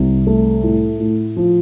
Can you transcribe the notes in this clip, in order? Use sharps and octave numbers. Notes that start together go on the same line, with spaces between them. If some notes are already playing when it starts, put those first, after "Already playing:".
Already playing: C2
A3
A2
A2
F3